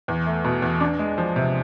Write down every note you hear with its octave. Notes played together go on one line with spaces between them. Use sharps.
E2
A3
B2
E2
D4
G#3
F3
C3